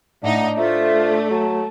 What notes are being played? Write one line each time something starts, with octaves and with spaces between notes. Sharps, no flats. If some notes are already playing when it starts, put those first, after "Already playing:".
A2 D4 D#4 E5 F#5
A3 F4 C5 E5
F#3 A5